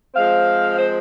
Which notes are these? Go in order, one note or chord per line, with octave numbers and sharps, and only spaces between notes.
F3 G#3 C4 F5
C5